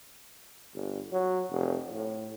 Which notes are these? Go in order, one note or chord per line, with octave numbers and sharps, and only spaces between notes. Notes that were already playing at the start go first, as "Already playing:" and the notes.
G1
F#3
F1
A2